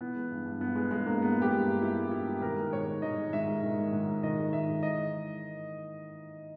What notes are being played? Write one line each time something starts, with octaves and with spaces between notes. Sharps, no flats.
E3 B3
G#3
G2
G2
E3 B3
G#3
G2 G#3
G2 A#3
E3 B3
G#3 G4
G2
G2
E3 E4
G#3
G2 E4
G2
D#3 A#4
G#3
G#2 C#5
G#2
D#3 D#5
G#3
G#2 E5
G#2
D#3
G#3
G#2
G#2
D#3 D#5
G#3
G#2 E5
G#2
E3 D#5